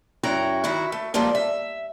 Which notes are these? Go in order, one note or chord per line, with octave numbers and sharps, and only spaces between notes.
F#2 E4 F#4 G5 A#5
D#3 E4 F#4
A3
F3 G3 G#3 A#3 F4
E5